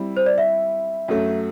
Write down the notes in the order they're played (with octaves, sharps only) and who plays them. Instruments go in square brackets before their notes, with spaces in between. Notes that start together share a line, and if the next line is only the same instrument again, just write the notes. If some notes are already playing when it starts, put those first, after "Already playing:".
Already playing: [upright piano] G3 C4 E4
[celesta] C5
D5
E5
[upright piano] F#2 F#3 A3